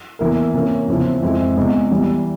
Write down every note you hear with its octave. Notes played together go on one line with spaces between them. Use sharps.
E2 E3 A#3 E4 A#4
C3 E3 A#3 C#4
E2 C#3 F3 C4 E4
F2 E3 G#3 C4 E4
E2 C3 E3 G#3 E4
E2 E3 G3